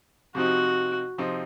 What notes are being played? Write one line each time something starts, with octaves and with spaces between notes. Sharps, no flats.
C3 F3 C4 D#4 F#4
C3 F3 C4 D#4